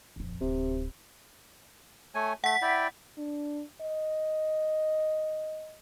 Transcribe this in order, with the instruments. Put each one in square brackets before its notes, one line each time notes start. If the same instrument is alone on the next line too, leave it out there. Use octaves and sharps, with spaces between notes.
[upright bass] D#1 F2
[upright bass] D1 [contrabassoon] C3
[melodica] A3 C#5 G#5
[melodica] A3 [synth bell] F#5 B6
[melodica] E4 D5 G5
[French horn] D4
D#5